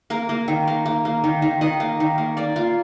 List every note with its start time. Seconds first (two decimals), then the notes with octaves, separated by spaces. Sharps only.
0.10 A#3 A#4
0.29 A#3
0.48 D#3
0.67 A#3
0.86 A#3
1.05 A#3
1.24 D#3
1.42 D#3
1.61 D#3 D#5
1.80 A#3
2.00 D#3
2.18 A#3
2.37 A#3 D5
2.56 A#3 F4